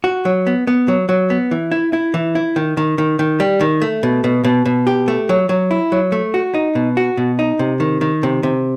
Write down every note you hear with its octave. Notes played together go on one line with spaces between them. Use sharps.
F#4
F#3
B3
B3
F#3
F#3
B3
E3
E4
E4
E3
E4
D#3
D#3
D#3
D#3
G3
D#3
A3
B2
B2
B2
B2
G4
A3
F#3
F#3
E4
F#3
A3
F#4
D#4
B2
F#4
B2
D#4
C3
D#3
D#3
C3
C3